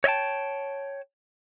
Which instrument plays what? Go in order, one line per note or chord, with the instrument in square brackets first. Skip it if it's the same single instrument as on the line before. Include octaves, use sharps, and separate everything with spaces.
[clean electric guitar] C#5 D#5 E5 G5 A5